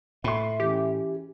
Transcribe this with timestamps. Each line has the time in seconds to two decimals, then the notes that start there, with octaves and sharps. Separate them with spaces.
0.24 A2 E5 B5 C6
0.60 E3 C#4 G4